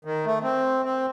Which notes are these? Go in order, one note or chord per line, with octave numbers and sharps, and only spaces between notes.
D#3
A3
C4
C4